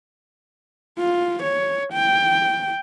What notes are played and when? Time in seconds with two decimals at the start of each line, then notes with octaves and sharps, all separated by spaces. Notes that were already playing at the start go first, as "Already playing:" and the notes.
0.99 F4
1.43 C#5
1.93 G5